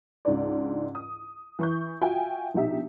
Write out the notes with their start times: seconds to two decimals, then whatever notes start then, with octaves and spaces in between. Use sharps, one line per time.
0.25 C#2 G#2 D4 D5
0.95 D#6
1.59 E3 C#6 G6
2.01 F4 F#4 E5 G5 G#5
2.54 A#1 B2 D#4 G4 E5